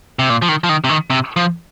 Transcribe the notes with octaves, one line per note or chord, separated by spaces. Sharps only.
C3
A#2
F3
D#3
F3
D#3
C3
D#3
C3
F3